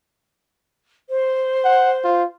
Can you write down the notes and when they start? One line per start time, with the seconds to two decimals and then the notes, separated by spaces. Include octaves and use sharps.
1.09 C5
1.64 F#5
2.04 F4